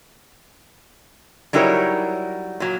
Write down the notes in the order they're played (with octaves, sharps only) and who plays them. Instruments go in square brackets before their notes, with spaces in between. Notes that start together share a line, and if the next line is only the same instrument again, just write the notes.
[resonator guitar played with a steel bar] F#3 G3 D#4 E4 A#4 C#5
A#2 F#3